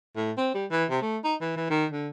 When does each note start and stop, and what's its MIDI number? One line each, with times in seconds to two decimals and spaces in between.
0.16 0.31 45
0.38 0.53 60
0.55 0.66 55
0.71 0.85 52
0.90 1.01 48
1.02 1.18 57
1.24 1.35 63
1.41 1.55 52
1.57 1.66 52
1.70 1.86 51
1.91 2.09 50